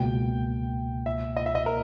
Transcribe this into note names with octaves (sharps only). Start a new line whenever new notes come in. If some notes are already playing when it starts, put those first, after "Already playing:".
Already playing: C#2 B2 A#3 G5
E5
D#5
E5
D#5
A#4